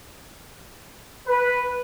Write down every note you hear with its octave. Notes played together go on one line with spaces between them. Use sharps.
B4